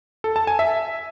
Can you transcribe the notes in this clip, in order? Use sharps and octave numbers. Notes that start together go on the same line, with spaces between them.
A4
A5
G#5
E5